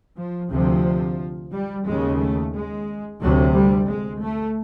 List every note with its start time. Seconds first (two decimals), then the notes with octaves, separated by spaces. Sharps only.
0.18 F3
0.51 D2 C3 F3
1.51 G3
1.86 D#2 C#3 G#3
2.20 A3
2.53 G#3
3.21 D2 C3 F#3
3.53 G3
3.88 G#3
4.21 A3